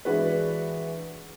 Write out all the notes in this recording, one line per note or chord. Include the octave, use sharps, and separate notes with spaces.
E3 G#3 D4 F#4 G#4 B4